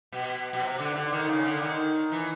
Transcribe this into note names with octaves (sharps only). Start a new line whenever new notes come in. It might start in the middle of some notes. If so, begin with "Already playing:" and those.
B2
B2
C3
D3
D3
D#3
C#3
D3
D#3
E3